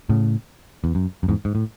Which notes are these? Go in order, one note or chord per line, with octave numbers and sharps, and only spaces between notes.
A2 C#3
E2
F#2
F#2
E2 G#2
G#2
A2